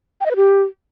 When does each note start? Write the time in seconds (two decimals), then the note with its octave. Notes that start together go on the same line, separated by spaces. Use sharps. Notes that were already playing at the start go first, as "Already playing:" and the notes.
0.21 G5
0.26 D#5
0.31 B4
0.36 G4